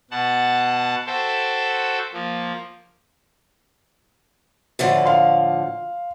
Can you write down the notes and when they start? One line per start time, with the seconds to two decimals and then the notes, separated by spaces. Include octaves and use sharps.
0.11 B2 F#5 A5
1.07 F#4 A4 C5 E5 G5
2.13 F3 A#3
4.79 A2 D3 F3
5.05 F5 C6